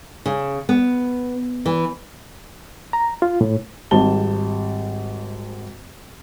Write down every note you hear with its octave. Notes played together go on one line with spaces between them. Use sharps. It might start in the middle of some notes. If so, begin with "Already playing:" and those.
C#3
B3
E3
A#5
F4
A2
G#1 G#2 G3 A5 G7